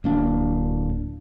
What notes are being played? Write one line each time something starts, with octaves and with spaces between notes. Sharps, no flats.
D1 A#3 D4